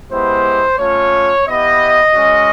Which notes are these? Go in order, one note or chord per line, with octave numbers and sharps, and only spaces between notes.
G#3 B3 E4 G4 C5
A3 C#4 F4 C#5
B3 E4 G4 D#5
G#3 C#4 F#4